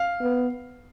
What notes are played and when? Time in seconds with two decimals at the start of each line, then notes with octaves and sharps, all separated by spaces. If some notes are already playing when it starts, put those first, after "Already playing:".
Already playing: F5
0.21 B3